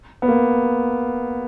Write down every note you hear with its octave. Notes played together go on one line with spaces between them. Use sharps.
B3
A#3